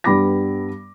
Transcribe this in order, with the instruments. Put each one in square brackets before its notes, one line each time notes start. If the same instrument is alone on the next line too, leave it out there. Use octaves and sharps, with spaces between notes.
[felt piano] G2 G3 B3 B5 D6 A#6